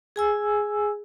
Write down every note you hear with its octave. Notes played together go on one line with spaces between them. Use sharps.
G#4 G#5 E6